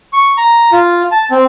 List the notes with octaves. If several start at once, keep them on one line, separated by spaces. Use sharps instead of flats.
C#6
A#5
F4
A5
C4